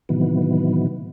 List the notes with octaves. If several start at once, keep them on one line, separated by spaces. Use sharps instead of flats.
A2 C3 D#3 E3 F#3 B3